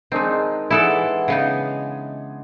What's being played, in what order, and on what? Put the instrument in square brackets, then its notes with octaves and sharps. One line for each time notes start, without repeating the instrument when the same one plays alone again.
[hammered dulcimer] D#3 G#3 D4 [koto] C4 D#4
[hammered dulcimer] E3 G#4 F#5 [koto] E4 A4 D5
[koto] C#3 B3 D#4